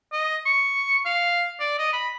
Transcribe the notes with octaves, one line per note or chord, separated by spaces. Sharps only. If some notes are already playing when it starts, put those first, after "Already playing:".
D#5
C#6
F5
D5
D#5
B5